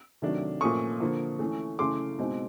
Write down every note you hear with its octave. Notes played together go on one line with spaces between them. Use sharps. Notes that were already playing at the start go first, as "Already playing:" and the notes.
C3 D#3 F#3 A3 D4
A#2 F3 A3 C#4 C#6 D#6
D3 F3 A#3
E3 A3 C#4
C#3 E3 A3 C#4 C6 D6
B2 G#3 C4 D#4